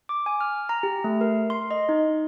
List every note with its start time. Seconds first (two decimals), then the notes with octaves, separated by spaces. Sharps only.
0.09 D6
0.26 G#5
0.41 F6
0.69 A#5
0.83 G4
1.04 A3
1.21 A#4
1.50 C6
1.71 D#5
1.89 D#4